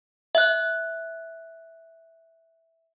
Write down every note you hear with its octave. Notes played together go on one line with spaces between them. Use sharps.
E5 F#6